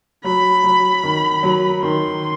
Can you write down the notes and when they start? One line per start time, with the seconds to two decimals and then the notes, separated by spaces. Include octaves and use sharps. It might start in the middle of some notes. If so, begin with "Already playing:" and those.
0.24 F#3 B5
0.64 F#3
1.03 D#3
1.43 F#3
1.82 D#3 C6